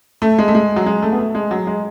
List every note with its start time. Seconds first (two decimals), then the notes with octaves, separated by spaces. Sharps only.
0.22 A3
0.39 G#3
0.48 A3
0.55 G#3
0.76 F#3
0.86 G#3
1.03 A3
1.12 B3
1.19 A3
1.35 G#3
1.51 F#3
1.67 G#3